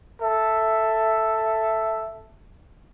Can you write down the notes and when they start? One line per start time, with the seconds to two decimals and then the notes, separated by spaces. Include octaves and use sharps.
0.21 A4 E5